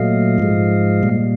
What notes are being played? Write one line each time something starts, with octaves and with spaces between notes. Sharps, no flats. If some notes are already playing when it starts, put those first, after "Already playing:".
Already playing: A#2 F#3 A3 D#5 F5
G#2 F3 G#3
A#2 G3